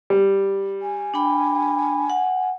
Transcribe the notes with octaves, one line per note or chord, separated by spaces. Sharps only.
G3
G#5
D4 G5 B5
F#5